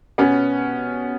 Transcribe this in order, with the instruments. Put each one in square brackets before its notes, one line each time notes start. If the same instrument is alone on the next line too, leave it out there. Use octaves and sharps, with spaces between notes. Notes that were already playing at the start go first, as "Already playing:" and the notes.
[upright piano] B2 B3 C#4